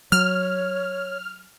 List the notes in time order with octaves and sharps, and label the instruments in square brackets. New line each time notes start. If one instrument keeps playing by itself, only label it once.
[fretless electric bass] F#3 [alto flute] C#5 [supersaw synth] F6